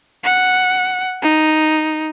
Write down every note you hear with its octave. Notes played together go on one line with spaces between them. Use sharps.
F#5
D#4